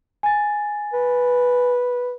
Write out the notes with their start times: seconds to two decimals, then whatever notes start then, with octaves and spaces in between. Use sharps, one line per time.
0.23 G#5 A6
0.93 B4